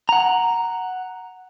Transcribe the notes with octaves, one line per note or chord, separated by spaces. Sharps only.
F#5 A#5